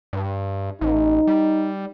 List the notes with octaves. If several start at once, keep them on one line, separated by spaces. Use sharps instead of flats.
G2
A1 D#4
G3